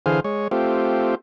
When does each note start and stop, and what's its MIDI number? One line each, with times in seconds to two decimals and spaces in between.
0.06 0.20 50
0.06 0.20 52
0.06 0.20 68
0.06 0.20 72
0.06 0.20 77
0.24 0.48 56
0.24 0.48 73
0.51 1.15 57
0.51 1.15 60
0.51 1.15 65
0.51 1.15 67